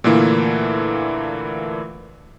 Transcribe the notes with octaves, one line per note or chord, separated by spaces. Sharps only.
A#2 D3 E3 A3 A#3 E4